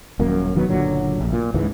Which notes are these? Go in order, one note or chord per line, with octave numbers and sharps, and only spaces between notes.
D#1 F#2 A#3
D#1 D#3 F#3 B3
F#1 A#2 D3 F#3
A#1
A#2
C#2 G#2 E3